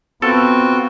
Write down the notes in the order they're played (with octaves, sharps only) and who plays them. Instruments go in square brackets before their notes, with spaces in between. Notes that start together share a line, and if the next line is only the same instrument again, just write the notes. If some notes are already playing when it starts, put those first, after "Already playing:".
[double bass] B3 [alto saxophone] C4 [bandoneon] F4 F#4 [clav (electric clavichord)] A4